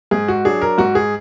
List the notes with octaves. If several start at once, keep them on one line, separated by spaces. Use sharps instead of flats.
G#2 G#4
F#4
F#3 D4 G#4
A#4
G#2 F#4
G#4